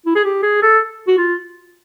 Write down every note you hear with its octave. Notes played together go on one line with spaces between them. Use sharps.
E4
G#4
G4
G#4
A4
F#4
F4